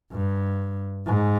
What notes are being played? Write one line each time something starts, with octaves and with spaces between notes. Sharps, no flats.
G2
G#2